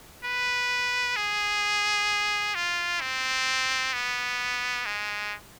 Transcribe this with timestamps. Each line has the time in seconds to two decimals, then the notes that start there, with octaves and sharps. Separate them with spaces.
0.24 B4
1.16 G#4
2.55 F4
3.01 C4
3.93 B3
4.86 G#3